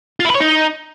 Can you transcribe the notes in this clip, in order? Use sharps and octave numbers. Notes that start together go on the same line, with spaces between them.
F4
E4
B4
C#5
D#4